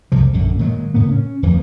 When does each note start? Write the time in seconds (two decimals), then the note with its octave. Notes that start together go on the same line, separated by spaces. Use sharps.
0.12 F1 C2 C3 F3
0.33 A#1 F#2 D3
0.59 A#2 D#3 F#3 G#3
0.94 A2 C#3 A#3 B3
1.11 C#4
1.43 D1 F2 E3 F3